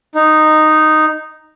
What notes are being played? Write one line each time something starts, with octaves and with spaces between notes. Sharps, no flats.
D#4